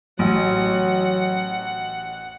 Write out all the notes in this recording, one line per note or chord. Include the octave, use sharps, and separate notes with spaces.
A1 F#3 F#5